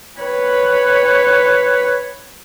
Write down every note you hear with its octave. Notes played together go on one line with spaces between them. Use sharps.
B4 C#5